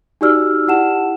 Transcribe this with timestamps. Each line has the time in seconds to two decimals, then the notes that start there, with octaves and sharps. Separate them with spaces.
0.21 D#4 F#4 G4 D5 E6 F6
0.68 E4 G4 F#5 A5 E7